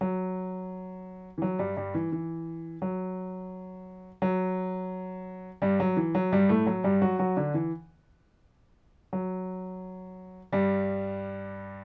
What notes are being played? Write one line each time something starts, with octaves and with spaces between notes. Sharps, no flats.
F#3
E3
F#3
G2 G3
G2 G3
E3
E3
F#3
F#3
G2 G3
F#3
E3
F#3
G2 G3
A2 A3
F#3
G2 G3
F#3 F#4
F#3 F#4
D3 D4
E3
F#3
G2 G3